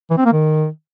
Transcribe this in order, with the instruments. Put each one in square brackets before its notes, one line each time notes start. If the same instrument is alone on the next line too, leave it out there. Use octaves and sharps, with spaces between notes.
[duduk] E3
C4
A#3
D#3